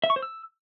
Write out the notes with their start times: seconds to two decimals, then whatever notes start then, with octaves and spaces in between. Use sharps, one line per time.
0.04 E5
0.10 C#6
0.16 C5
0.22 E6